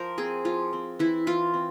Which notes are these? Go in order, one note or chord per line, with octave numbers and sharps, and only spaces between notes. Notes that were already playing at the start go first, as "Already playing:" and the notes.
Already playing: F3 A#4 C5
C4 G#4
F3 F4
C4
E3 E4
E3 F4
C4